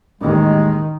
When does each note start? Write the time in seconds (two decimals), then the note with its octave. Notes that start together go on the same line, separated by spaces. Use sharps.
0.21 A1 D#2 D#3 G#3